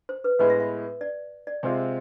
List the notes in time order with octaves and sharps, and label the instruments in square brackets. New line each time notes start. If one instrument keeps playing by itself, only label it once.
[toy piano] C5
B4
[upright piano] A2 G#3 B3 E4 [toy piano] B4
[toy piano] E5
E5
D5
D5
[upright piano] C3 G#3 C4 F4